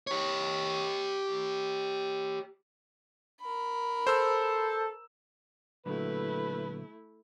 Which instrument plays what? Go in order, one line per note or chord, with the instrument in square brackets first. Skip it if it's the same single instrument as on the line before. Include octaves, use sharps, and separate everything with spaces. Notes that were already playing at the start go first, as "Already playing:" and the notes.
[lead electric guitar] G4 C#5
[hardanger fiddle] A#4 B5
[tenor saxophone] A4 [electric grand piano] C5 E6
[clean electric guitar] A#2 D3 F#3 [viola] A3 E4 [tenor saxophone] B4